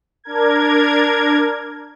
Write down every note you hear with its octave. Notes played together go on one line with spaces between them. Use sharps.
D4 A#4 G#6